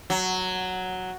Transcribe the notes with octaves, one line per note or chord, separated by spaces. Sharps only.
F#3